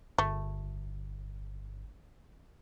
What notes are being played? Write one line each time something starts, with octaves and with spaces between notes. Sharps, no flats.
G1 A3